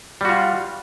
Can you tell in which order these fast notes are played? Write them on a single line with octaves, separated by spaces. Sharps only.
G3 F#4 F4